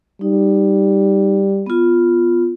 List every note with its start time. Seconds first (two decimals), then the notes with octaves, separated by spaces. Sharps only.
0.21 G3 D#4
1.66 B3 F4